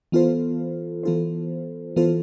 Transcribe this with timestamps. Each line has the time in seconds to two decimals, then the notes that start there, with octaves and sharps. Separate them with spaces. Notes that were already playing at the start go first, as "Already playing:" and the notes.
0.12 E3 B3 F4 A4 C5
1.03 E3 B3 F4 A4 C5
1.96 E3 B3 F4 A4 C5